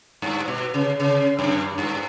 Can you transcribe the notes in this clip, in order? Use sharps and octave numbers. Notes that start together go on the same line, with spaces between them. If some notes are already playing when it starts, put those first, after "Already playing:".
G2
B2
C#3
C#3
F#2
G2